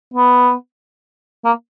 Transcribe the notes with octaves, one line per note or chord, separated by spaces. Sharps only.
B3
A#3